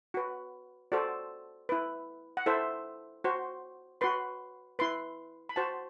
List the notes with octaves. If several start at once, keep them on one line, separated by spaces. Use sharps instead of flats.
F#4 B4
F#4 A4 C5 D5
E4 B4
F#5
E4 A4 C5 E5
F#4 C5
F#4 B4 C6
E4 B4 C6
B5
F#4 C5 A5